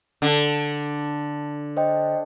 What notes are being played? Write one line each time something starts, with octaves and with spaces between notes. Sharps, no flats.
D3
C5 D#5 G5